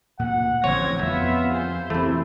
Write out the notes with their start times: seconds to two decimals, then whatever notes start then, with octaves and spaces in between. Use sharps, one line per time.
0.19 D2 A#2 F#5
0.64 A1 D3 F3 C4 C#5 G#6 A#6
1.02 F2 B3 F4 E5
1.53 G#4 C5
1.90 C3 E3 A3 C4 E4